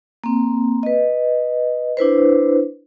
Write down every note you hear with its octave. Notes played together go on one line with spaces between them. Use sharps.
A#3 C4
B4 D#5
D4 E4 B4 C5